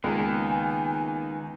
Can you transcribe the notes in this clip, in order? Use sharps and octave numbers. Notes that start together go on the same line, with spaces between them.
C#2 D#3 A#3 B3 A#4 G#5